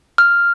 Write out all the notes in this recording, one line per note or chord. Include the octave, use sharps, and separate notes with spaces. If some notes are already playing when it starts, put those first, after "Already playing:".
F6